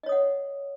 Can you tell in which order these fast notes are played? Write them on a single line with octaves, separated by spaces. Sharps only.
D#5 C#5 D#6 F#5